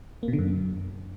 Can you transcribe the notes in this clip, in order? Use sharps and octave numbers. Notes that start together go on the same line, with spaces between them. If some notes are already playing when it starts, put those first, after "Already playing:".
A#3
B2
D3
F#2